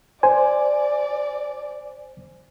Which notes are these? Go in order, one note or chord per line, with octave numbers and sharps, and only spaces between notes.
C5 D5 G#5